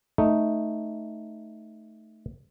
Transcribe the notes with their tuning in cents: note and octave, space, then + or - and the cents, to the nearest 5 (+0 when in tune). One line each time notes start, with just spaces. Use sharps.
A3 +0 D#4 +0